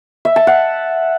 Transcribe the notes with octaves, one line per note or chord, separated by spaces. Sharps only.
E5
A5
F#5